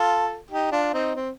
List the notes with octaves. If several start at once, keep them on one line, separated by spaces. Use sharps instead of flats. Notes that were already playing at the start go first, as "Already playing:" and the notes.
Already playing: F4 A4
D#4 G4
D4 F4
C4 D#4
C4